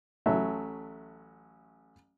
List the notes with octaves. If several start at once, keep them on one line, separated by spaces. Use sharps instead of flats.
A1 F#3 A3 E5